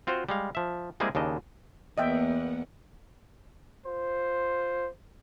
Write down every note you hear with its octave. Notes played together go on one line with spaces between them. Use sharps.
C4 F4 F#4 C5
G3 G#3 F5
F3 E5
G3 G#3 A#3 C4 E4 G#4
D#2 C#3 D4 D#5
E2 A#3 B3 D#5 E5 F#5 G5
F4 C5